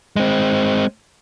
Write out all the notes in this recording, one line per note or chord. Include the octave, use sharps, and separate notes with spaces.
G#3 C4